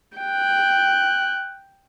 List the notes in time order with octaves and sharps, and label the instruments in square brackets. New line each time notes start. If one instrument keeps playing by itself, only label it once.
[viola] G5 [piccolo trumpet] F#6